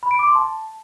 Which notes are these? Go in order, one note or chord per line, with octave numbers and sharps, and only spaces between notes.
B5
D7
D6
C6
A5